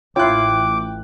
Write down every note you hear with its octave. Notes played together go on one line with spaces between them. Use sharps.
A1 E4 F4 C#5 G5 D6 F#6